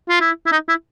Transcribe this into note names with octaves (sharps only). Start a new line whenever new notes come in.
F4
E4
E4
D#4
E4